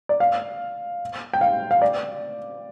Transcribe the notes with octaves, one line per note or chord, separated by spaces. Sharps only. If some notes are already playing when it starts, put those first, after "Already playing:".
D5
F5
G5
F5
F5
D5